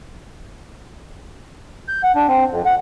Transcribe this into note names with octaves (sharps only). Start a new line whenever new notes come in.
G6
F#5
D4
C4
F2
F#5